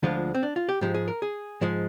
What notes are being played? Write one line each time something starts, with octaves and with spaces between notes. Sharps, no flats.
D2 D3 F3 G#3 F4
C4
D4
F4
G4
G#2 F3 G#3 G4
G#4
A#4
G#4
G#2 F3 G#3